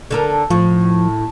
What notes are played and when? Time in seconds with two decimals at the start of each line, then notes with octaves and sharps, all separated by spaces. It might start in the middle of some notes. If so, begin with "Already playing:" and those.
0.11 D3 A4 A#4
0.50 A2 F3